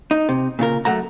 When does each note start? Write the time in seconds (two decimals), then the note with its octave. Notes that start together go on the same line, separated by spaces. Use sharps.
0.11 D#4
0.29 C3
0.59 A#2 C#3 F4 A#4
0.85 F#2 A3 F#5 A#5